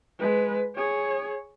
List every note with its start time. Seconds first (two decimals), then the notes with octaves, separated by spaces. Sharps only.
0.20 G#3 B4
0.76 G#4 C#5